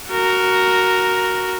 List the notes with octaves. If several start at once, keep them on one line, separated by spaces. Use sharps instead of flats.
F#4 A#4